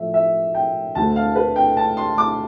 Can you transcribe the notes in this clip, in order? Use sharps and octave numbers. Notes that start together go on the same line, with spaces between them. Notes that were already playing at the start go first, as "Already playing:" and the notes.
Already playing: A2 F3 A3 E5
E5
G5
D2 D3 A3 A5
F5
B4
G5
A5
C6
D6